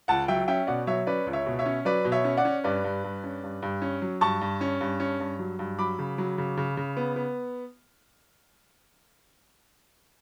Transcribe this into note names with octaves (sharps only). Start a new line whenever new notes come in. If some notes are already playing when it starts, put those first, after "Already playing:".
C#2 F#5 A5
F#3 E5 G5
C#4 E5 G5
B2 D5 F#5
F#3 C#5 E5
C#4 B4 D5
C#2
C#5 E5
B2
C#5 E5
C#4
F#3 B4 D5
B2
C#5 E5
C#4
D5 F#5
C#4
G2 B4 D5
G2
G2
C#4
G2
G2
C#4
F#3
G2 A5 C#6
G2
C#4
G2
C#4
G2
F#3
G2
F#3 B5 D6
C#3
F#3
C#3
C#3
C#3
B3
B3